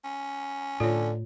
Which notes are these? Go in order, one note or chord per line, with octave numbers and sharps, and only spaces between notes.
C#4
A2 D3 F4 C#5